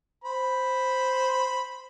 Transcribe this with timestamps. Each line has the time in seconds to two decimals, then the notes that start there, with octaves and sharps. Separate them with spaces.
0.24 C5 B5